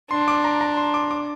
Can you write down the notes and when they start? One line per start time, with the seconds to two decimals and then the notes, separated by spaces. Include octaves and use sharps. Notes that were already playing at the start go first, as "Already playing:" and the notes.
0.11 D4 C6
0.28 D6
0.44 A#5
0.61 A#5
0.77 C6
0.94 D6
1.11 D6